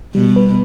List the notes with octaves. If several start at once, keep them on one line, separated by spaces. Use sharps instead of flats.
B2 G3
B4